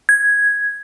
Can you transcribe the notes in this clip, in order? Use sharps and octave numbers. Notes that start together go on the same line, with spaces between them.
G#6